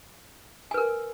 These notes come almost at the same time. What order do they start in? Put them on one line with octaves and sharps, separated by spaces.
G#5 B4 A#4